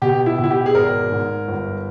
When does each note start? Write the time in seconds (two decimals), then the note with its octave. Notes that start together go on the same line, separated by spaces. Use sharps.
0.02 B2 G4
0.26 E4
0.39 B2
0.44 E4
0.50 G4
0.66 G#4
0.74 G#1 A#4
1.11 G#2
1.48 G1